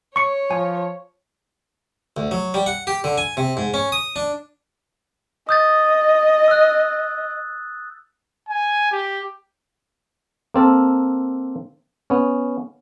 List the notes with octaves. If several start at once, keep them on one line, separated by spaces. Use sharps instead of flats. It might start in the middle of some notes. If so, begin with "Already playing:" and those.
C#5 C#6 C#7
F3 G#5
D2
F#3
G3
F#5
G4
D3
G#5
C3
G#2
C#4
D#6
D4
D#5 D#6 G6 A6
E6 F#6
G#5
G4
A#3 C4 A4 A#4
B3 C#4